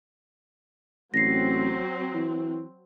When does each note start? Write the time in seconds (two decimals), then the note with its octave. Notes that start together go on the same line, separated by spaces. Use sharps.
1.14 A1 F#3 C4 A#6 C7
2.14 E3